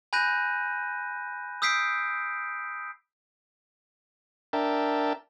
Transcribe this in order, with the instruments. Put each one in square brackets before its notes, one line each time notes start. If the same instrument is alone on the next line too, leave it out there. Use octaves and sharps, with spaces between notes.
[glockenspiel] G#5 B5 F#6 G6 A#6 D#7
D#6 E6 G6 B6 C7 D7
[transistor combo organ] D4 A#4 E5 G5 A5